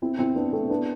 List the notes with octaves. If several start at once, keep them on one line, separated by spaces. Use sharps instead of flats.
C4 E4
C4 E4
B3 D4
A3 C4
B3 D4